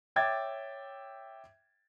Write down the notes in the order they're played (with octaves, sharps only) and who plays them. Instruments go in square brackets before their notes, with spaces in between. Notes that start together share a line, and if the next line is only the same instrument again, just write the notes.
[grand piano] C#5 E5 G5 D6 G#6 A6